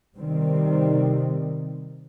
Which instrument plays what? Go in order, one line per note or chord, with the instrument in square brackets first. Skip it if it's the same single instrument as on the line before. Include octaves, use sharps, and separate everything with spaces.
[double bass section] C3 D#3 G3 C4